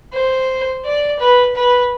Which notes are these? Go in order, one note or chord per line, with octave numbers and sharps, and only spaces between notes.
C5
D5
B4
B4